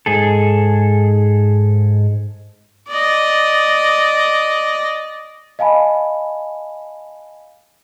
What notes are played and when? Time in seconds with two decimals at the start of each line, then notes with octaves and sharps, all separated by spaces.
0.06 G#2 G#4 A4
2.88 D5 D#5
5.59 D#5 F5 G#5 A5 B5